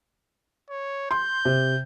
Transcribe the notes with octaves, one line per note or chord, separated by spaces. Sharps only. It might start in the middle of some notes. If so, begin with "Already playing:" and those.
C#5
C6 G6
C3